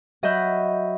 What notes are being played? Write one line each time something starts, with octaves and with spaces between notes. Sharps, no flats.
F#3 D#5 E5 B5 G6